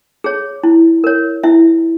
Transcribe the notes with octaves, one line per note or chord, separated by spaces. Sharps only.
G#4 C#5
E4
A#4 C#5
E4 E5